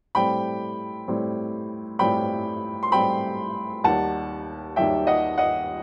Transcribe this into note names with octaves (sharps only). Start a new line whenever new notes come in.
A2 G3 C4 G5 B5
A2 G3 C4
A2 G3 C4 G5 B5
C6
A2 G3 C4 G5 B5
D#2 D#3 G3 F#5 A5
D#2 D#3 G3 E5 G5
D#5 F#5
D#5 F#5